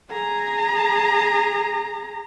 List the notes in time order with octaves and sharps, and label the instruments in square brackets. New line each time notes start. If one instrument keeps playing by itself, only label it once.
[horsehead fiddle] G#4 A#5